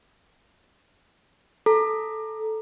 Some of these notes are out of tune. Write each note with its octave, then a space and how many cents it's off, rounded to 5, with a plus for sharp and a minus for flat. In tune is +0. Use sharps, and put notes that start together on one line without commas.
A4 -5 A#5 +0 D6 +30